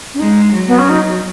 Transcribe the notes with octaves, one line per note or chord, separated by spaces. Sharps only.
C#4
G#3 D#4
F#3
B3
C#4
D#4